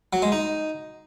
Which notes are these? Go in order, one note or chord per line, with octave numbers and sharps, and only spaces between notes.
F#3
G#3
D#4